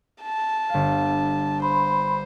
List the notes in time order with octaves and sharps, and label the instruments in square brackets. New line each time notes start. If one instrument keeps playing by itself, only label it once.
[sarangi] A5
[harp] G1 F5
[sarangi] C5 [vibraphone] B5 C6